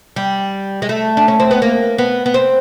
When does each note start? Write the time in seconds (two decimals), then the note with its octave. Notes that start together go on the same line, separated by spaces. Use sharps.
0.16 G3
0.82 G#3
0.89 A3
1.17 D4
1.28 C#4
1.40 C4
1.51 B3
1.62 A#3
1.98 B3
2.26 B3
2.34 C4